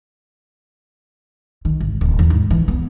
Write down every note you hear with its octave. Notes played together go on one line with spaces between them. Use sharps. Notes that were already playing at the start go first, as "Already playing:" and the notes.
D#3
G#1
D1
E2
G#2
E3
B3